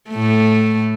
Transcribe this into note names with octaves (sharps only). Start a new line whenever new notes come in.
A2 A3